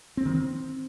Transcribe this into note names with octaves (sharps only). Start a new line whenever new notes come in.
C4
D#3
C4